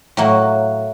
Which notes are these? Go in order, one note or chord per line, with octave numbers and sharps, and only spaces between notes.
A2 F#3 A#3